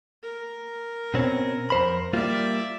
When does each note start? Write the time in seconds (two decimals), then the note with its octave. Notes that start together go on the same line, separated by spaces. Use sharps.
0.23 A#4
1.14 B2 C4 C#4
1.70 F2 C5 B5
2.13 G3 A#3 F4 D5 E5